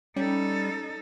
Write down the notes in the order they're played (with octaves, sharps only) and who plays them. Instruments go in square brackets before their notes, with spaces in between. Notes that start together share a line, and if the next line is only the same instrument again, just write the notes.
[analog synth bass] G3 [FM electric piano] C#4 [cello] D#4 A4